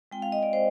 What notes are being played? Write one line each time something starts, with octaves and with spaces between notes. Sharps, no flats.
G#3 C4 F4 G5
F5
D#5
D5
C5